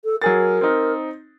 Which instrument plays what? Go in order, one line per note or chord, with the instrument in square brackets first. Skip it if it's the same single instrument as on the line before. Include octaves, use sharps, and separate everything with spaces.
[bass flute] A4
[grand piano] F#3 G#4 A6 [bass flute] A#4
[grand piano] C4 D#4